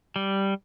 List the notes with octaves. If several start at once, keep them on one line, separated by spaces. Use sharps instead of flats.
G3